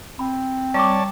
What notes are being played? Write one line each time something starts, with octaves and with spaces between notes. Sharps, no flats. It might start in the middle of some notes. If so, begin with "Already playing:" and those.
C4 B5
G3 B4 C#5 D5 A5 C#6 D6